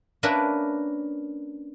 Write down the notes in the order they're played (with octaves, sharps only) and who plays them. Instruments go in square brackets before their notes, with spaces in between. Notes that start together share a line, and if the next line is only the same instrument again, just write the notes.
[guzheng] A#3 C#4 D4 A#4 B4 E5